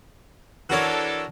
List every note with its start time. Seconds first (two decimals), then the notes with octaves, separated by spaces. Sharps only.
0.70 E3 D4 F#4 A4 A#4 C#5